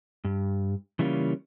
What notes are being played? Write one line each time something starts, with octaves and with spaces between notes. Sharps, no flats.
G2
C#3 E3 G3 A#3 C#4 F4